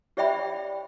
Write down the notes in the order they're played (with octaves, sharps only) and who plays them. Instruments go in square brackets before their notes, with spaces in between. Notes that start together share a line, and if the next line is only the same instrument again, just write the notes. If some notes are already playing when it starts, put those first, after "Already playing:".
[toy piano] G4 C#5 D5 E5 G5 B5